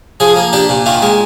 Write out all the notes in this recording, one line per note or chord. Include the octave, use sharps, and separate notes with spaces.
F3 G#4
A#3
D4 G4
A#2
D#3 F4
G#3